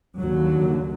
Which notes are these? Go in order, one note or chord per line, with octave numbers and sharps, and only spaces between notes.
D#2 D3 F#3